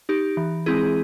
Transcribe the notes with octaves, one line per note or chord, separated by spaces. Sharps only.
D#4 G4
E3
G#3 C4 E4 G#4